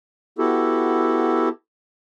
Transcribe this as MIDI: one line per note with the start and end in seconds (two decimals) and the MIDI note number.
0.38 1.49 59
0.38 1.49 64
0.38 1.49 66
0.38 1.49 67
0.38 1.49 69